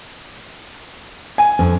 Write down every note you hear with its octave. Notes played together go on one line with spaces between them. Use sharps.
G#5
F2